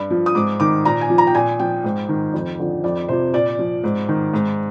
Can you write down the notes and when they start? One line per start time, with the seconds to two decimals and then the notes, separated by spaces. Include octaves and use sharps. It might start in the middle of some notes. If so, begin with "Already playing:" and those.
Already playing: G2
0.10 F3
0.26 D#6
0.35 G#2 D6
0.60 D#3 D6
0.85 A#2 A#5
1.01 G#5
1.10 F3
1.18 A#5
1.27 G5
1.35 A#2 G#5
1.59 F3 G5
1.84 G#2
2.09 D#3
2.34 F2
2.59 D3 F3
2.84 F2 D5
3.08 C3 F3 C5
3.33 A#2 D5
3.59 F3
3.84 G#2
4.09 D#3
4.34 G#2